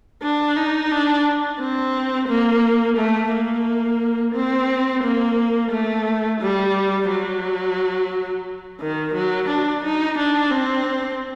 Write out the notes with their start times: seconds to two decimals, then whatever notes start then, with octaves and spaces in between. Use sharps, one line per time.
0.22 D4
0.56 D#4
0.91 D4
1.60 C4
2.28 A#3
2.97 A3
3.32 A#3
4.35 C4
5.03 A#3
5.71 A3
6.40 G3
7.08 F#3
8.81 D#3
9.14 F#3
9.48 D4
9.83 D#4
10.18 D4
10.51 C4